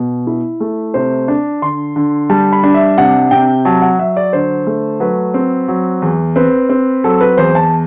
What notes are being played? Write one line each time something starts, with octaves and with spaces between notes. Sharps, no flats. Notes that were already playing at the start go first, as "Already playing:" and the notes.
Already playing: B2
E4
A3
C3 C5
D4
D3 C6
D3
G3 A5
B5
D4
E5
C3 F#5
C3 G5
F#3 A5
F#5
F#3 E5
D5
D3 C5
A3
F#3 B4
C4
F#3
E2
C4 B4
C4
F#3 A4
B4
E2 C5
A5